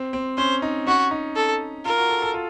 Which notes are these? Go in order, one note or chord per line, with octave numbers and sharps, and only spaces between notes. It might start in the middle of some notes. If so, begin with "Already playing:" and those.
Already playing: C4
C4
C#4 C5
D#4
C#4 F#4
D#4
A4
F4 A#4
F#4
A4
A4
F4